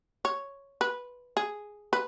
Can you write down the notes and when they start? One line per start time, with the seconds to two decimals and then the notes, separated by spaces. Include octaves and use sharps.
0.25 C#5
0.81 B4
1.37 G#4
1.93 B4